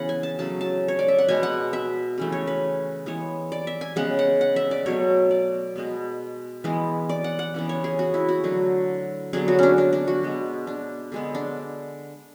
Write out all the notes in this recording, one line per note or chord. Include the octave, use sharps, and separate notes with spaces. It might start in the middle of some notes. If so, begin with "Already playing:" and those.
Already playing: C#3 E3 B3 F#5
G#5
A5
C#3 F#3 A3 A5
A5
C#5
D5
E5
F#5
B2 G#3 B3 G#5
F#5
E5
C#3 E3 A3
C#5
B4
E3 G#3 B3 C#5
D5
E5
G#5
C#3 G#3 B3 F#5
F#5
F#5
E5
D5
B2 F#3 A3 C#5
D5
B2 G#3 B3
E3 G#3 B3
D5
F#5
F#5
C#3 E3 B3
C#5
G#4
F#4
E4
F#4
D3 F#3 A3
D3 F#3 B3 G#4
F#4
C#4 D4
D4
D4
F#4
B2 G#3 B3
D4
D3 G#3 B3
D4